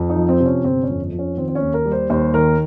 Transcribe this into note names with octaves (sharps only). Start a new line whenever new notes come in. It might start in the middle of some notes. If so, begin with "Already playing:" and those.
Already playing: F2
D#4
F3
C4
C3
C#4
G1 C4
C#4
F2
F3
C#4
D#3 C4
C4
C#4
D#2
A#4
G3
C5
D#2 C5
D#3 A#4